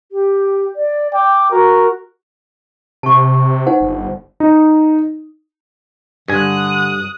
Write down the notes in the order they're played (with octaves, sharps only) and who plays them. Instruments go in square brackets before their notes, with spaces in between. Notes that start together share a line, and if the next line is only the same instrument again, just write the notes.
[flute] G4
D5
[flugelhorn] G5 [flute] D6
[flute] F#4 [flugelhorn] A#4
[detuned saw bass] C3 [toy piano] A5 C#6
[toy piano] D#4 C5 F#5
[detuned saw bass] G1
[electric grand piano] D#4
[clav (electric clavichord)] G2 G#5 [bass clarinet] D3 [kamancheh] D#6 F#6